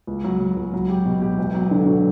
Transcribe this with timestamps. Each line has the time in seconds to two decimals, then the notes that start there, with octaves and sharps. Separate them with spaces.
0.07 C#2
0.24 F#3
0.40 F#3
0.56 C#2
0.74 F#3
0.90 G4
1.06 B2
1.22 G4
1.38 E1
1.54 F#3
1.71 D3
1.87 F#3